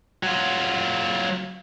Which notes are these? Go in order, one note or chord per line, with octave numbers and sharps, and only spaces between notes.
F#3 F4